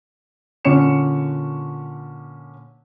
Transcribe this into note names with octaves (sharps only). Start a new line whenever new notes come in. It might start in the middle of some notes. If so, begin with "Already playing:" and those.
A#2 D3 C#4 C#6 C#7 E7